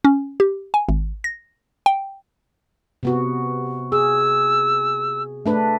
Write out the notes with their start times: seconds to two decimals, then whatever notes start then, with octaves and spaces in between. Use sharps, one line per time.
0.05 C#4
0.40 G4
0.74 G#5
0.89 G#1
1.24 A#6
1.86 G5
3.03 C3 B3 F#4
3.92 G#4 E6
5.46 A3 D4 B4